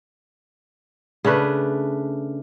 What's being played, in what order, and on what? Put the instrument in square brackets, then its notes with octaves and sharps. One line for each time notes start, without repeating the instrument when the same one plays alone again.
[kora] C#3 A3 D4 B4